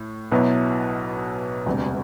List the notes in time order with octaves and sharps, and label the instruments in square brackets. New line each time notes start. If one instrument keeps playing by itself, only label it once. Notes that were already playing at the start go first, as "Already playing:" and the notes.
Already playing: [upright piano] A2
B1 B2 F#3 B3 E4
E1 D2 C3 G3